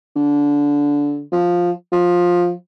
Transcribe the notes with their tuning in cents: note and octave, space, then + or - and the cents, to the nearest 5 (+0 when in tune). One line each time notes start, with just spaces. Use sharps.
D3 -20
F3 +10
F3 +15